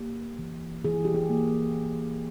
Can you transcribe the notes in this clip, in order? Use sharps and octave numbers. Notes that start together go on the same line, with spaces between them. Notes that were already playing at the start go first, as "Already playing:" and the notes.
Already playing: A#3 G4
E3
E3 G#4
G4
G#4
A#3